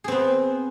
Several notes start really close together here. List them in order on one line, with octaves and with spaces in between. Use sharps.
G#4 C4 B3